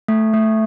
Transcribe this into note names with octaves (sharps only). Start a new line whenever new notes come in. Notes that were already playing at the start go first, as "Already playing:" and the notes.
A3
A3